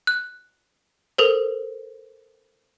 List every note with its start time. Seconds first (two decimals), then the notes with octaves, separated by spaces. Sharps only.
0.07 F#6
1.18 A4 A#4 C5